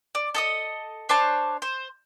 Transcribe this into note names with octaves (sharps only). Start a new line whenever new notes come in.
D5
A4 D#5 D#6
D4 C5 C#5 A5
C5